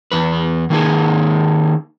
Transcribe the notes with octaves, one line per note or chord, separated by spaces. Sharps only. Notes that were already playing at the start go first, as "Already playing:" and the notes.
E2 B4
D#3 A#3 D#4 G#4